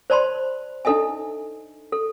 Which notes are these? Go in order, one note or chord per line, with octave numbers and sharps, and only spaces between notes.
C5 D5 A5 B5 C6
D4 D#4 A4 D#5 E5 G#5
A4